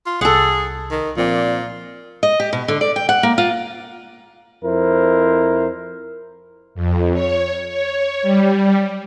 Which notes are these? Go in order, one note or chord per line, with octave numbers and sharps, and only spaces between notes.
F4
C2 G#4 A4 F#5
D#3
A#2 F3 C4 D5
D#5
G4
B2
D3
D5
G5
F#5
A#3
F4
F2 E4 A#4 C5
F2
C#5
C#5
G3